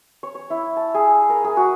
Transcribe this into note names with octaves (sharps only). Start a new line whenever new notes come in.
C#5
C#5
E4
A5
G#4
A#4
G#4
F#4